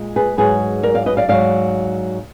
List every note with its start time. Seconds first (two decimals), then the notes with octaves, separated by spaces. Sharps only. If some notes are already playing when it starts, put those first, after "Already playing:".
Already playing: A#2 G#3
0.16 G#4 B4
0.38 G#2 F#3 G#4 B4
0.83 A#4 D5
0.94 D5 F5
1.06 B4 D#5
1.17 D5 F5
1.28 G#2 F#3 D5 F5